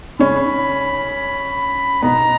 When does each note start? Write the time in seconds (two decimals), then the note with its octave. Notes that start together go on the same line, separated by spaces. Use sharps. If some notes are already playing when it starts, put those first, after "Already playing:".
0.19 C#3 C#4 B5
2.02 B2 B3 A#5